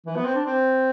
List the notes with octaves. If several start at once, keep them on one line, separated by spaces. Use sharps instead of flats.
E3
B3
C4
D4
C4